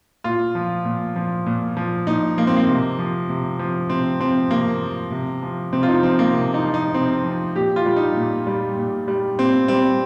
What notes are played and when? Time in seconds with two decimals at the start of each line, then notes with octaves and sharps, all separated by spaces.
0.24 A#2 F4
0.55 F3
0.85 A#2
1.16 F3
1.46 A#2
1.77 F3
2.07 A#2 D#4
2.38 F3 A#3
2.47 C4
2.57 A#3
2.68 C3
2.99 F3
3.29 C3
3.59 F3
3.89 C3 C4
4.20 F3 C4
4.51 C3 A#3
4.81 F3
5.11 C3
5.43 F3
5.73 C3 C4
5.83 F4
5.88 D#4
6.03 F3 C4
6.19 A#3
6.33 C3
6.54 D#4
6.64 F3
6.74 D#4
6.94 C3 C4
7.24 F3
7.56 A#2 G4
7.76 F4
7.86 G3
7.96 D#4
8.16 A#2
8.47 G3
8.77 A#2
9.08 G3
9.38 A#2 C4
9.68 G3 C4